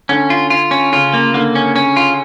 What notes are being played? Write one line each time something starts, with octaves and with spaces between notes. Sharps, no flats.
D3 C#4
F4
F4
C#4
C#3 F4
A#3
D3 A#3
C#4
C#4
F4